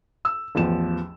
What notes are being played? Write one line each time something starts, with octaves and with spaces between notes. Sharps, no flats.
E6
A1 E2 F3 E7